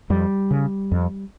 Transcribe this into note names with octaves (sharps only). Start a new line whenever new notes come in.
F2 G3
C#3
F2